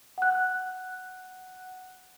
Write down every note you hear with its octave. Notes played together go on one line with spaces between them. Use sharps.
F#5 F#6